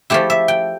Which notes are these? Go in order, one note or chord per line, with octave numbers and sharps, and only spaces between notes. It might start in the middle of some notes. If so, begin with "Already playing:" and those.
F3 A3 E4 G4
E5
G5